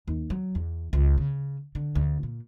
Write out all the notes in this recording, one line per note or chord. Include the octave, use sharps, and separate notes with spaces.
D#2
F#3
E2
C#2
C#3
D3
D2
A#2